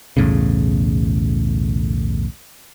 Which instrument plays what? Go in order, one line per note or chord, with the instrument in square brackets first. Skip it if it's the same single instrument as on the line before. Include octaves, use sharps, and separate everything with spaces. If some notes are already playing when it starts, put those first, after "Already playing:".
[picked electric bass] B1 E2 A2 C#3